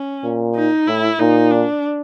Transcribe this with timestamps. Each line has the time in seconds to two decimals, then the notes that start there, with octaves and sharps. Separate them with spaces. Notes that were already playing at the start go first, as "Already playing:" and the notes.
Already playing: C#4
0.24 A#2
0.55 D#4
0.87 A2 E4
1.19 A#2 D#4
1.51 D4